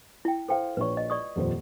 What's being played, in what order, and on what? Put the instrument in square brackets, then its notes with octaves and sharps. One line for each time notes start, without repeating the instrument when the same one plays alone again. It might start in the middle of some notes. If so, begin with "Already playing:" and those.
[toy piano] E4 G5
[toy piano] A4 G5 [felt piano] C5 F5
[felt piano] A#1 C#5 [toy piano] B4 C#6
[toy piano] D#5
D5 C#6 D#6
[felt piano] D#1 F2 C5